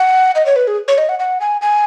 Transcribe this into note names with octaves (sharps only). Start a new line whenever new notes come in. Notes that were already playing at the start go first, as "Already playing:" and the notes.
Already playing: F#5
D#5
C#5
B4
G#4
C#5
D#5
F#5
F#5
G#5
G#5